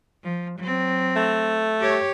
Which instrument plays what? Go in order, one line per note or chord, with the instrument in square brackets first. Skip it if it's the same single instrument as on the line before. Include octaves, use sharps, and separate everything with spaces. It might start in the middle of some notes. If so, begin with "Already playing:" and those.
[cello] F3
F#3 C4
[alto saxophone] A3
[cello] G4 C#5